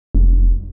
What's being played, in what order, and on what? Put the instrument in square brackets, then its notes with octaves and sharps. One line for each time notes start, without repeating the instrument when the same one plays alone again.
[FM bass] F1